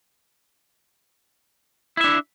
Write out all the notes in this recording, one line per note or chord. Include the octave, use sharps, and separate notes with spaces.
D4 E4 E5